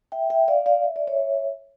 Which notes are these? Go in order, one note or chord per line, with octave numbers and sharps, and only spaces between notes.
E5 G5
E5 G5
D5 F5
D5 F5
E5
D5
C#5 E5